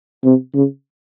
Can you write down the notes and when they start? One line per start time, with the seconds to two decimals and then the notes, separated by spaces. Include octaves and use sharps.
0.24 C3
0.55 C#3